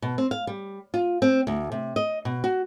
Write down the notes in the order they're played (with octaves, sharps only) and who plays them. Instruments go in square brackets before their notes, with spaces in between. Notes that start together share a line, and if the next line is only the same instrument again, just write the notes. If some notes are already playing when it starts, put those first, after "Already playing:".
[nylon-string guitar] B2
C4
F5
G3
F4
C4
D2
C3
D#5
B2
F#4